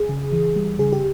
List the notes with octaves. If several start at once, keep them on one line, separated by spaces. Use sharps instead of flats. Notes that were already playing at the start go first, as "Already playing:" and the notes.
Already playing: G#4
C#3
E3
G3
C#3 G#4
G4